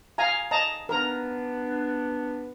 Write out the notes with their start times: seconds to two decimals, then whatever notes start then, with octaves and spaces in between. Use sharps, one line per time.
0.18 F5 G#5 A#5
0.51 D#5 A5 A#5
0.89 B3 D4 A#4 A#5